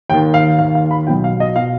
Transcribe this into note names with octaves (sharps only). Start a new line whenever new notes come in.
D#2 D#3 G5
F5
D#2 D#3 F5
F5
B5
B1 B2 G5
F5
D#5
B2 F5